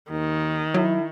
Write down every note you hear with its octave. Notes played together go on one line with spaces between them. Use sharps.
D#2 D#3
F#3 E4